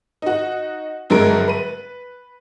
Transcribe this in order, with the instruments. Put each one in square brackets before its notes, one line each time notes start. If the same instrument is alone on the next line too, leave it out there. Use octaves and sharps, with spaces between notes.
[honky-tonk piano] D#4 F#4
G1 D3 F#3 G#3 A#4 D7
B4 D#7